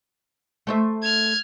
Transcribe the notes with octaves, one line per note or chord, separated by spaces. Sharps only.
A3 C5 E5
F6 G#6